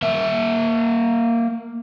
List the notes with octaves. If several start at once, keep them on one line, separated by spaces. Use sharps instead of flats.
A#3 E5